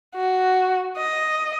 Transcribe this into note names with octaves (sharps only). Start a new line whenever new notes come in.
F#4
D#5